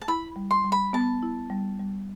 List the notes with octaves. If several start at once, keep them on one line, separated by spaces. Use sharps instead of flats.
A5
E4 B5
G3
C6
G3
B5
B3 A5
E4
G3
G3